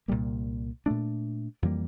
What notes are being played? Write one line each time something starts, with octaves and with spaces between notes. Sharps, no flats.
C2 A#2 G3 A#3
A#2 A3 D4
F2 E3 G3 A#3